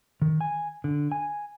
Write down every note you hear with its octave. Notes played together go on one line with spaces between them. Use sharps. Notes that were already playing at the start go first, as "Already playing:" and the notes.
D#3
G#5
D3
G#5